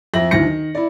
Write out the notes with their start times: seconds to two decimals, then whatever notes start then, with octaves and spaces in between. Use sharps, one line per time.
0.14 F2 E5 A#6 F#7
0.31 D2 D#3 E3 A#6 C#7
0.46 D#3
0.75 E4 D5